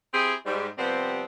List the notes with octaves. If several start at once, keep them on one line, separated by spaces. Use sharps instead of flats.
C4 E4 G4 G#4
G#2 G3
C3 F3 G3 B3 C4